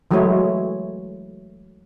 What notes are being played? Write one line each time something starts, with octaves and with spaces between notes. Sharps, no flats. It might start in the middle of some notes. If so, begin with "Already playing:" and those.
E3 F#3 G#3 A3 E4 C#5